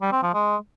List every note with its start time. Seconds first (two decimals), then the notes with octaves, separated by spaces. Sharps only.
0.02 G3
0.12 C4
0.23 F3
0.34 G#3